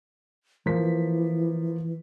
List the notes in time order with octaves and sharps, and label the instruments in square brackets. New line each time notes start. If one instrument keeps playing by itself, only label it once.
[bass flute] E3 [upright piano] F3 A#3 B6